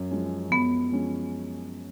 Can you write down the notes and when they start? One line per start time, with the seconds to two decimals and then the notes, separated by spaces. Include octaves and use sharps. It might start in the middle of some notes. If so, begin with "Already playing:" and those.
Already playing: F#2
0.11 F3 G#3 C#4
0.51 F#2 B3
0.92 F3 G#3 C#4